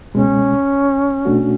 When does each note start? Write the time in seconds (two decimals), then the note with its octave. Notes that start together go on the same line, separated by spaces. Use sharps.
0.14 C#2 B2 G#3 C#4
1.25 B2 A3 D4 F#4